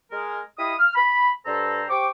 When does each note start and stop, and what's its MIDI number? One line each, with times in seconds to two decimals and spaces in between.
0.11 0.40 56
0.11 0.40 70
0.58 0.74 64
0.58 0.74 67
0.58 0.74 75
0.58 0.74 77
0.58 0.74 83
0.58 0.74 87
0.79 0.93 89
0.95 1.30 83
1.46 1.84 43
1.46 1.84 69
1.46 1.84 72
1.46 1.84 82
1.89 2.07 67
1.89 2.07 72
1.89 2.07 79
1.89 2.07 85
1.89 2.07 86